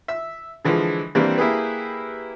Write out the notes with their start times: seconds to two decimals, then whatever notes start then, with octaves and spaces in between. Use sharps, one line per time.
0.08 E5 E6
0.65 D3 E3 F3 G#3
1.15 E3 G3 A#3 C4 D4
1.38 A#3 E4 G4 G#4 B4